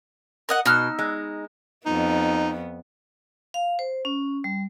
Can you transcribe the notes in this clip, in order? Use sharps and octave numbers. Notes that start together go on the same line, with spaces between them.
A#4 D#5 F#5
B2 D#4 E6 F6
G#3
F2 B3 D#4
F5
C5
C#4
G3